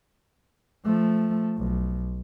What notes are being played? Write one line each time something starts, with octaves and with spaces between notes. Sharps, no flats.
F3 A3
B1